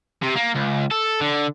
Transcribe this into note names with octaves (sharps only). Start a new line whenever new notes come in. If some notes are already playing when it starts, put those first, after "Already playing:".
C3
A#3
C#2
A4
D3